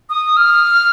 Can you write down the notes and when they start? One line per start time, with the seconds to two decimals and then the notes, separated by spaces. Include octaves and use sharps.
0.10 D#6
0.37 F6